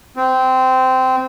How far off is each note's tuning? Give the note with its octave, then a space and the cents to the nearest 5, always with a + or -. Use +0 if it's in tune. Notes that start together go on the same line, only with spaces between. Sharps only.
C4 -15